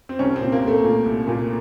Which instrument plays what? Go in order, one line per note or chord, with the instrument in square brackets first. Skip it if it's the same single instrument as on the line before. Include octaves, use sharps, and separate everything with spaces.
[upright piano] C4
C2 C#4
C4
A#2
A#3
C2 A3
A#2
C2
A#2